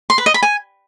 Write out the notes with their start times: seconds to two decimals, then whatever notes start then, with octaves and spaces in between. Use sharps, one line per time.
0.10 C6
0.18 B4
0.26 D#5
0.34 B5
0.43 G#5